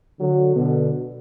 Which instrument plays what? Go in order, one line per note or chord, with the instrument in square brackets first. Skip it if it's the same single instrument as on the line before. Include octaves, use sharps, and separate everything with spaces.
[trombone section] D3 F#3
B2 D3